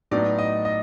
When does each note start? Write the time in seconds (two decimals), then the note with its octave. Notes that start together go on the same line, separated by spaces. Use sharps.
0.11 A2 F#3 B3 D#4 D5
0.38 D#5
0.65 D#5